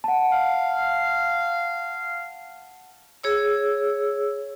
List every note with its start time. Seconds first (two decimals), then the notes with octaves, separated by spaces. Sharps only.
0.04 F#5 A5
0.32 F5
3.24 G#4 C#5 E6